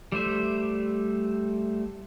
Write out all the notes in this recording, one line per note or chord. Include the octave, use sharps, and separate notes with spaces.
G3 A3 C5 E5